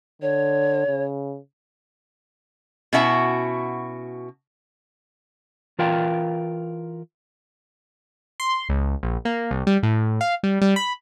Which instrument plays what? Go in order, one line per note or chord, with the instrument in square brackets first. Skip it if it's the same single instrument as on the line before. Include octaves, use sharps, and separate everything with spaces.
[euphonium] D3 [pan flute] C#5
[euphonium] C#3
[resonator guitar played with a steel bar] B2 C#4 E4 F#4 E5 F#5
[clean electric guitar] E3 F4 A#4 F5 G5
[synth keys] C6
C#2
A#1
A#3
C2
G3
A2
F5
G3
G3
B5